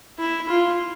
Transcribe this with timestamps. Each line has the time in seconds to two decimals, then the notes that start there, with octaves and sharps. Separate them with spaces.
0.19 E4
0.49 F4